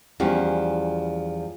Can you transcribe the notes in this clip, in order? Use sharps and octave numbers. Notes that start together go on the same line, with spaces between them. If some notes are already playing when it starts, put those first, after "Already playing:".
E2 F3 G3 C#4